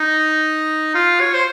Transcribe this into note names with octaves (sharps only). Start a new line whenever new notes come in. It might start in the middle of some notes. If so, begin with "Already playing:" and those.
Already playing: D#4
F4
C#5
C5